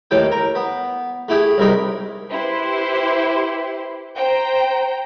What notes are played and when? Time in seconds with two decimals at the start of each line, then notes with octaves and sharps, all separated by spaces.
0.11 D#2 A2 E3 A4 G5
0.32 A#4
0.55 B3
1.28 A3 E4 G4 G#4
1.58 C2 C3 D#4 A#4 B5
2.31 E4 G4 B4 C5 C6
4.17 C5 G5 A#5